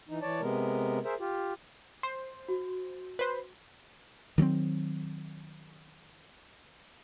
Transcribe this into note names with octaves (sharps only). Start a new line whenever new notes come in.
E3 D#4
E3 C#5 D5 A5
C3 G#3 B3 A#4
G#4 A#4 C5 E5
F4 G4
C5
F#4
B4 C5
D#3 F#3 G#3 C4